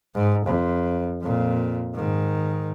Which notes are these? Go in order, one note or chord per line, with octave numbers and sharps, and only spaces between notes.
G#2
F2
F2 A#2
G#2 D#3